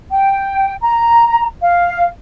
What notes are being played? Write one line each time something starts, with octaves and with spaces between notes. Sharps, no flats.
G5
A#5
F5